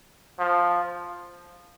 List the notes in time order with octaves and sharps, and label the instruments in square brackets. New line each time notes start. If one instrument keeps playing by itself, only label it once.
[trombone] F3